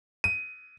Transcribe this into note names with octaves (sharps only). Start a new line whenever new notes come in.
D#7